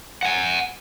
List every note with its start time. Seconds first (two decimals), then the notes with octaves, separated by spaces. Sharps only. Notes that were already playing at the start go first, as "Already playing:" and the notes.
0.23 F#5 G#5